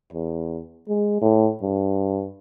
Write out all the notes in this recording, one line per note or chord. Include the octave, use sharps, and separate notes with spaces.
E2
G#3
A2
G2